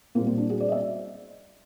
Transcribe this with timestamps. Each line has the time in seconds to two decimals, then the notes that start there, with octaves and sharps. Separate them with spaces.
0.15 A#2 A#3 C4
0.19 G3
0.26 A#3 C4
0.37 C4 D4
0.50 F#4 G#4
0.60 C5 D5
0.68 D#5
0.72 D5 E5